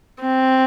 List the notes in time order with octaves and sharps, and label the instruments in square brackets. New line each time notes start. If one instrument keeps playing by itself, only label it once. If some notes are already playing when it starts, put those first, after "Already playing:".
[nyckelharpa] C4